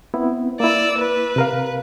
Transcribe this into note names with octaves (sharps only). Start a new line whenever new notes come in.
B3 C4 E4
A#3 E4 D5 E6
B4
C3 A#4 F5